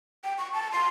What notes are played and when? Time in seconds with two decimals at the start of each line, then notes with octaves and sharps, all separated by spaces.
0.24 G5
0.38 C#6
0.53 A5
0.72 C6